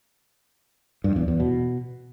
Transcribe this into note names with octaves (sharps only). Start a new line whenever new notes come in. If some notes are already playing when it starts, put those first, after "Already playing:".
G2
E2
E2
B2